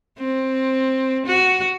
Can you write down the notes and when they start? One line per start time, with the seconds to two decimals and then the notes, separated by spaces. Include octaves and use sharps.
0.18 C4
1.27 F#4